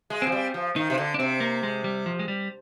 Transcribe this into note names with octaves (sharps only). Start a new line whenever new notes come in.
G#3
F3 C4
G3
F3
D#3 D#4
C3
D3
D4
C3 C4
A#3
G#3
G3
F3
G#3
G3